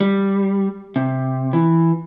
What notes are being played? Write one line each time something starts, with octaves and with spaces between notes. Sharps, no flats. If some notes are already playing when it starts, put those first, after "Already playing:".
G3
C3
E3